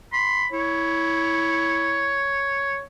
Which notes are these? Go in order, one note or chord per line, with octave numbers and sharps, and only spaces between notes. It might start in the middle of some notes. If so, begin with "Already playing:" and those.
B5 C6
E4 C#5